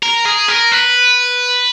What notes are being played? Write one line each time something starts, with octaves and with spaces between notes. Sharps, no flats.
A#4
G#4
A#4
B4